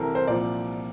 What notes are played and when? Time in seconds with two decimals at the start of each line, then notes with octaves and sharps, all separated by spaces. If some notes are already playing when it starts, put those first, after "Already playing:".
Already playing: C2 C3 E3 A4 A#4
0.15 C5
0.28 C2 A#2 F3 D5